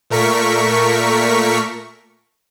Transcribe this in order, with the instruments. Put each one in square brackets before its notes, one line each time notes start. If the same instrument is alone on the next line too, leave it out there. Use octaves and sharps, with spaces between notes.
[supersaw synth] A#2 A3 A#4 C#6 B6